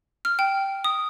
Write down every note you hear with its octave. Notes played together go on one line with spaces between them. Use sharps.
F6
G5
D#6